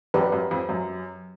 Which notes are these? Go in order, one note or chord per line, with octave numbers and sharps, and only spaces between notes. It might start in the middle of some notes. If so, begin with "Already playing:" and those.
F#2 G4 B4 D5
F#2
F2
F#2